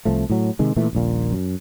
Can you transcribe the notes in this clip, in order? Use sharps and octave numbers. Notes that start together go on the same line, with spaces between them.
C2 F3 A3
A2 F#3
C3 D#3 G#3
A#2 E3 A3
D#1 A#1 A#2
F#2